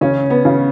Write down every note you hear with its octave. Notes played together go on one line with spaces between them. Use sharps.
C#3 C#4
B3
C#3